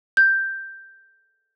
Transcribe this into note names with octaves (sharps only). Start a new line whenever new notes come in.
G6